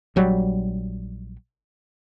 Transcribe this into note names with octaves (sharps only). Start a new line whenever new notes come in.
A#1 F#3 G3